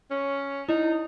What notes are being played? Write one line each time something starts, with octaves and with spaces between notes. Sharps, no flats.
C#4
D#4 E4